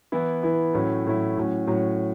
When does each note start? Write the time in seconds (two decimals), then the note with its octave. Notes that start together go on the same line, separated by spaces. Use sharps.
0.12 E3 B3 E4
0.43 E3 B3 E4
0.74 A2 F#3 A3 C#4 E4
1.06 A2 F#3 A3 C#4 E4
1.37 A2 F#3 C#4
1.67 A2 F#3 C#4